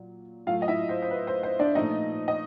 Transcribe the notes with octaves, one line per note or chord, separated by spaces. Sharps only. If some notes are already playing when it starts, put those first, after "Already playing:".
Already playing: A#2 F#3
A2 F#3 A3 F4 F5
D#5
E4 E5
C5
C5
B4
C5
C5
D4 D5
A#2 F3 A3 D#4 D#5
D#5